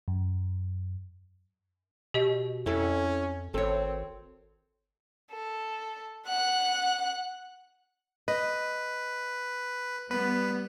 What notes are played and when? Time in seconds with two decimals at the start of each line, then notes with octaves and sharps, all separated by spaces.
0.08 F#2
2.14 B2 G4 D#5
2.66 F2 C#4 E4 A4
3.54 G#1 C4 A4 C#5
5.32 A4
6.28 F#5 F#6
8.28 B4 D#5
10.11 G3 B3 B4